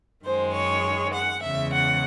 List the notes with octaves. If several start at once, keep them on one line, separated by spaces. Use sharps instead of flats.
F#2 D#3 G#3 C5
C#5
F#5
E2 C#3 G#3 E5
F#5